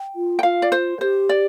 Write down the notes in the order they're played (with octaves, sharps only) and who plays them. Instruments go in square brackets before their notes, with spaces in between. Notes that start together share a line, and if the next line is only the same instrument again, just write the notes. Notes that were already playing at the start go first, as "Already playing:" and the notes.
Already playing: [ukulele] G5
[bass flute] F4
[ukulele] G5
[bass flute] F4 [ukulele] F5
[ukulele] D5
C5
[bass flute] G4 [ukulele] C5
[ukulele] D5